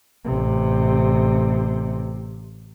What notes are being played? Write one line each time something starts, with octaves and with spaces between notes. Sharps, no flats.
A1 C3